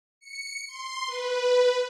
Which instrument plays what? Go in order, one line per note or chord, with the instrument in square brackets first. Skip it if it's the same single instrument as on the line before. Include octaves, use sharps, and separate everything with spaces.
[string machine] C#7
C6
B4